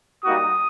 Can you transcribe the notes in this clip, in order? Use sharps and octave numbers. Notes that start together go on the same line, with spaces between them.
G3 A#3 D#4 F#4 D#6